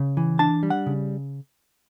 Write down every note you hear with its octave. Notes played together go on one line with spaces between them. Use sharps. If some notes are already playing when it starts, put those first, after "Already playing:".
Already playing: C#3
E3
D4 A5
G3
F#5
C#3